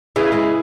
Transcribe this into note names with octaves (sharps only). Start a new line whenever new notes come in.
C#3 E3 E4 G#4
E3 G#3